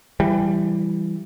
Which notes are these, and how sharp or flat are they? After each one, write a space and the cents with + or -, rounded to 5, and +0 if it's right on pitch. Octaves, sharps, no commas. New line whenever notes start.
E3 +20 G3 +0